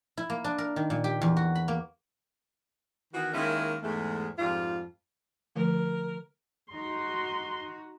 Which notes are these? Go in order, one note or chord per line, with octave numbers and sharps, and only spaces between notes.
E4
A#3
D4
A#4
D#3
A#2
G4
E2
F#4
B5
A#3
D#3 E3 B3 F#4
D#3 G#3 A#3 C#4 E4
E2 G#2 G#3 A3
F2 G#2 G3 F4
D3 F3 A3 A#4
D#4 F#4 C6